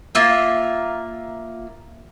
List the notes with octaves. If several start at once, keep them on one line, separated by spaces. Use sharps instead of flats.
A#3 F4 E5